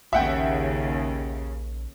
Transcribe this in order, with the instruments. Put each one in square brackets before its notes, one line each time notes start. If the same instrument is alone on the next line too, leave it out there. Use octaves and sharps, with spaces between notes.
[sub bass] A#1 [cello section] D#2 C#3 [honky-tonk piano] E5 F#5 G5